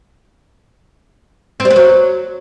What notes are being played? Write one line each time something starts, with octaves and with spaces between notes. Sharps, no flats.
C4
G3
B3
F#3